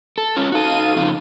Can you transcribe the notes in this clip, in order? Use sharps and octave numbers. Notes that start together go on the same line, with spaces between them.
A4
C#4 F4
D#4 F#4 A4 F5 D#7
F2 C#3 F4